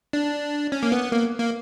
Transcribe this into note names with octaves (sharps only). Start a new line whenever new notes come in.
D4
C#4
A#3
B3
A#3
A#3